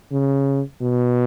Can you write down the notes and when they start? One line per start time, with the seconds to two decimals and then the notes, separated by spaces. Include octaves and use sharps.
0.12 C#3
0.82 B2